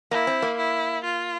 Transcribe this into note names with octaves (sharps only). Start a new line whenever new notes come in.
A#3 E4
C4
A#3
E4
F4